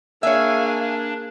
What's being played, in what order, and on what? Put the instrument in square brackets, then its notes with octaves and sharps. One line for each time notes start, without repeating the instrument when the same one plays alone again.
[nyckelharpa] A#3 G#4 [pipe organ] D4 [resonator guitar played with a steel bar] C#5 E5 [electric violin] F5 G#5